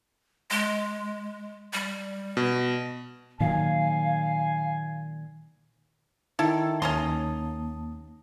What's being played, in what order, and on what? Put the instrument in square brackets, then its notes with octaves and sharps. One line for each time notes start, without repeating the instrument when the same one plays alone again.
[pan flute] G#3
G3
[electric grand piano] B2
[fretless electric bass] A#2 D#3 F#3 [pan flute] F5 [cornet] G#5
[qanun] D#3 [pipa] E4 A4 [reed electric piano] A5
[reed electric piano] D#2 A5 D#6 [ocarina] A#3 [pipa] C#4 A#5 C6